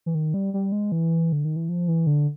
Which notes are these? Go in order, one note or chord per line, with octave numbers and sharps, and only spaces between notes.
E3
D#3
G3
G3
G#3
E3
D3
D#3
E3
F3
E3
D3